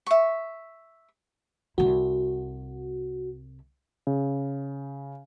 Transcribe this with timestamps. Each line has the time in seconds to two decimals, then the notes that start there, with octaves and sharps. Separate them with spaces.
0.07 E5 C#6
1.78 C2 E4 F#4
4.07 C#3